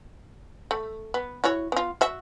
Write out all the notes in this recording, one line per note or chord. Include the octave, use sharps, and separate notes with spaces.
A3
B3
E4 F#4 C#5
B3 F4
F#4 E5